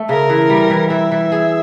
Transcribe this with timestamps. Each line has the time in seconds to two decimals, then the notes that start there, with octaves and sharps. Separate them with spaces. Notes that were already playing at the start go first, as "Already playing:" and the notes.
Already playing: A3
0.09 C#3 A#4
0.30 E3
0.50 G3
0.70 E3
0.90 E3 E5
1.12 E3
1.32 G#4